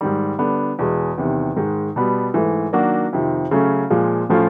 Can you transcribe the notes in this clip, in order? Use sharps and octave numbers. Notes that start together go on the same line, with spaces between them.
G#2 D#3 G3
D3 G3 B3 D4
E2 B2 G#3
E2 C3 D#3
G#2 D#3 G#3
B2 G3 B3
G#2 E3 A3
D#3 F#3 A#3 D4 F#4
F2 C3 D#3
C#3 F#3 A3 C#4
A#2 F3 G#3
A2 F3 A3 C#4 F4